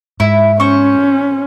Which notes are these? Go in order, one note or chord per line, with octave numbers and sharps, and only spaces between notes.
G#2 E4
C#4 C5 C#6